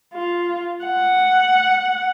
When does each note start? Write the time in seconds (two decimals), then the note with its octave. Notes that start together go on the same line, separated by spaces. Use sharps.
0.14 F4
0.85 F#5